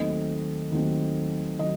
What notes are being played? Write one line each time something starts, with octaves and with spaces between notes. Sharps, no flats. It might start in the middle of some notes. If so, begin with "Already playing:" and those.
Already playing: D#2 D#3 F#3 A3 C4 D#5
D#2 D#3 F#3 A3 C4
D#3 F#3 D#5